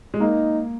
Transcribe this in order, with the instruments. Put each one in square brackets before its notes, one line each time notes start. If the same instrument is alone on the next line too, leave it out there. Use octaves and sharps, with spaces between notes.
[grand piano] G#3
[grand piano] A#3 [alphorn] D#4